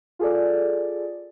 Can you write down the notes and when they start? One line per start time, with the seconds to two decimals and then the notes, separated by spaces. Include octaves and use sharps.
0.19 F4 G#4 A4 D5